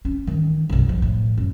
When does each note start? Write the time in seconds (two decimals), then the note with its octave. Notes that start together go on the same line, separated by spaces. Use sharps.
0.05 C#4
0.27 D#3 E3
0.69 F#1 B1
0.89 F3
1.02 A2
1.37 F#2